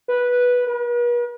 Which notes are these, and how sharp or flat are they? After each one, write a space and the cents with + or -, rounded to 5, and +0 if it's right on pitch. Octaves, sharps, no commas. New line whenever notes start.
B4 -10
B4 -45